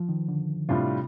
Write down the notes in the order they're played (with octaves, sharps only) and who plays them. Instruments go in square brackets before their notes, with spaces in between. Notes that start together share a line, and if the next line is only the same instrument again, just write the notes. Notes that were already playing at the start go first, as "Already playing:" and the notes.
Already playing: [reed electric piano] F3
D#3
D3
[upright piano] A2 G3 D4 F4 [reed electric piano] C3